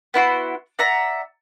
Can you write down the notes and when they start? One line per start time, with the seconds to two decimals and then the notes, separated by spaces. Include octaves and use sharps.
0.14 B3 E4 F#4 C6
0.79 D5 E5 F#5 A#5